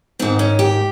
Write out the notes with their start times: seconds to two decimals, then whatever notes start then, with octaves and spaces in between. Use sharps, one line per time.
0.19 G#2 D#3 C4
0.39 C#4
0.59 G4